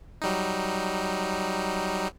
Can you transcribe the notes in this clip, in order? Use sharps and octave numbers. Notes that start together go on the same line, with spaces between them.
F#3 G3 D#4